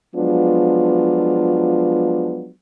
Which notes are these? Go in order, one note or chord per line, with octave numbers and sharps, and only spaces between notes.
F3 F#3 G#3 B3 D4 F4